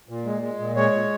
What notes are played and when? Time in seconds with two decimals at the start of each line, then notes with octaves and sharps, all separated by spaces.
0.09 A#2
0.26 G#3
0.42 G#3
0.59 A#2
0.76 G#3 C#5
0.92 A#2